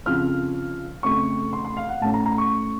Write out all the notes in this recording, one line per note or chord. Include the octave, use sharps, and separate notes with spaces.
F2 C#3 F3 C4 F6
F2 C#3 A3 C4 C#6
C6
C6
F5
F#5
A2 A3 C#4 A5
A#5
A#5
C#6